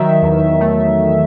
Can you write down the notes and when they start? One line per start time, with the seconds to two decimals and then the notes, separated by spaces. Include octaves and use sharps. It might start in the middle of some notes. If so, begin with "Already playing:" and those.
Already playing: D#3 F#3 E5
0.22 E2
0.60 A3